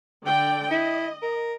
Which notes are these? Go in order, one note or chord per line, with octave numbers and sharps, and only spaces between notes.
D3 D5 G5
E4 D#5
A#4